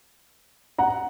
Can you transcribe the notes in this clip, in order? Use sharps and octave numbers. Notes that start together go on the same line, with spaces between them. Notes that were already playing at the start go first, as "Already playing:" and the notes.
F#5 A#5